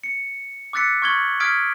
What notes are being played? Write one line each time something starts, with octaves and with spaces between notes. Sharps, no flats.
C#7
D6 E6 F#6 A6 B6 C#7
C#6 F6 G#6 F#7 G7
D#6 F6 G#6 B6 D7